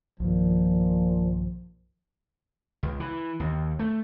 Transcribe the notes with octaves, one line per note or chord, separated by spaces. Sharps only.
B1 G2 A#2 D#3 F3
C#2
E3
D#2
A3